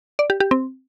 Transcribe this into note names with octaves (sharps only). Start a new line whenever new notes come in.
D5
G4
G4
C4